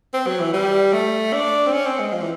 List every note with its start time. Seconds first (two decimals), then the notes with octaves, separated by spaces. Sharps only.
0.14 C4
0.27 F#3
0.40 E3
0.53 G3
0.93 A3
1.33 D4
1.66 C4
1.73 C#4
1.86 C4
2.00 G#3
2.13 F3
2.21 E3